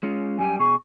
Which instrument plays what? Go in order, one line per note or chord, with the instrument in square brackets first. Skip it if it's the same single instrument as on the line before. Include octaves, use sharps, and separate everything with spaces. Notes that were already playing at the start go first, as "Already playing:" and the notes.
[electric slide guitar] G#3 C#4 F4
[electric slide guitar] F#2 G3 G4 [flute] G#5
[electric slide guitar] B2 G#4 [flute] C#6